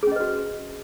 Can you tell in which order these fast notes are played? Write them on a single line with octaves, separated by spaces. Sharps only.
G#4 C#4 D#5 B4 F#4